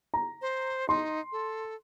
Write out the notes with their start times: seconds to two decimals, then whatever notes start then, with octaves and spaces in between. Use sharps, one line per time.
0.14 A#5
0.42 C5
0.89 D#4 C6
1.32 A4